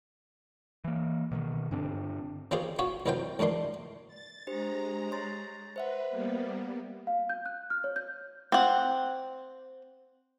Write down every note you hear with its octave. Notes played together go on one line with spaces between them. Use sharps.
E3 A#3
B2 D3 D#3
G2 D3 C4 D4
D#3 C#4 F4 G4 G#4 C5
C#4 F4 F#4 C#5
C2 F#2 D#3 F#3 C5 G5
C#2 F#2 D#3 D4 C6
A6
G#3 D4 G4 C5 A#5
C#5 C6 A6
B4 C5 E5 F#5
G3 A#3 B3
F5
G6
F#6
F6
C#5
G6
C4 F#5